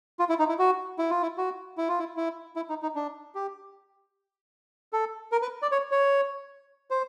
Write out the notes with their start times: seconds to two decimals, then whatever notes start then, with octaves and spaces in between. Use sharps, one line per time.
0.19 F4
0.29 E4
0.39 D#4
0.49 E4
0.59 F#4
0.98 E4
1.10 F4
1.22 E4
1.38 F#4
1.78 E4
1.88 F4
1.99 E4
2.17 E4
2.56 E4
2.69 D#4
2.82 D#4
2.95 D4
3.35 G4
4.93 A4
5.32 A#4
5.42 B4
5.62 D5
5.72 C#5
5.91 C#5
6.90 C5